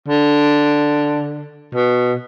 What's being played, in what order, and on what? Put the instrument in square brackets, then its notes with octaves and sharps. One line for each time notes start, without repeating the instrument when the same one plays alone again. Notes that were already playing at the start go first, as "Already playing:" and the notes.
[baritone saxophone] D3
B2